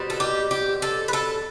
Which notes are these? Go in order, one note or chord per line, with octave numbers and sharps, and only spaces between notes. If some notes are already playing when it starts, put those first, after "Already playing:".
Already playing: B2 G3 C4
A4
G4
G4
A4
B4
A4